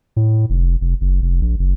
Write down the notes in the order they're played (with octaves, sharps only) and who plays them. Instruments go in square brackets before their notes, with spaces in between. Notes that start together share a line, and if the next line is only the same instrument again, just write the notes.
[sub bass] A2
F1
F1
F#1
F1
A#1
F#1